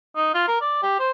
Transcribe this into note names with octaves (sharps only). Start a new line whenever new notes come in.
D#4
F4
A#4
D5
G4
C5